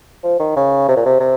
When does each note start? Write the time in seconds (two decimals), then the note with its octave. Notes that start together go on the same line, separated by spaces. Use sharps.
0.24 F3
0.40 D#3
0.56 C#3
0.89 C3
0.96 A#2
1.06 C3
1.21 C3